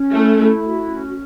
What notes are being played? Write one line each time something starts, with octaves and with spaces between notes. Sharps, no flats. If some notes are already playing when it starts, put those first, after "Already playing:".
Already playing: C#4
A3 E4
E4
F#4
C#4